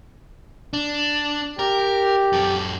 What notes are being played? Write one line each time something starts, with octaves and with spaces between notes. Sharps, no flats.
D4
G4 A#4
F#2 A4